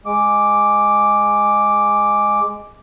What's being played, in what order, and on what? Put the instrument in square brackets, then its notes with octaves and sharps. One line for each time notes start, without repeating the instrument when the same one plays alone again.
[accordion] G#3 D6